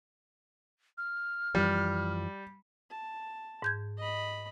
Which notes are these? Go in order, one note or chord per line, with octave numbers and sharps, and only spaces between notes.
F6
F#2 E3 F3 G3
A5
G#2 G6 G#6
D#5 B5